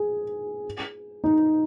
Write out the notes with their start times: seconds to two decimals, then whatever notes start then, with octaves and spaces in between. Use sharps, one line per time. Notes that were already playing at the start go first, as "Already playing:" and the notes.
Already playing: G#4
1.24 D#4